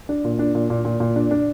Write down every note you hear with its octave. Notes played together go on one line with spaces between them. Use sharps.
D4
A#2
D4
A#2
A#2
A#2
A#2
D4
D4